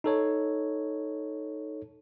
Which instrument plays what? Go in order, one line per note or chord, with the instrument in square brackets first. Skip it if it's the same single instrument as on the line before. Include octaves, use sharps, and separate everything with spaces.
[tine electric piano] D#4 A4 C#5